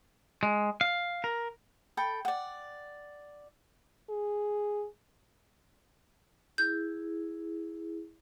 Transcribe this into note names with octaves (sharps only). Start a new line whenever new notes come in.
G#3
F5
A#4
A4 G5 B5
D5 F#5
G#4
E4 G#4 G6